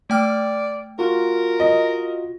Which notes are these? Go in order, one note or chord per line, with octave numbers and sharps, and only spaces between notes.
A3 D5 G5 F6
F4 F#4 A#4
D#5